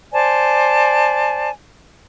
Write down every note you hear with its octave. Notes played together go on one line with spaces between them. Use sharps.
C5 D5 G#5 A5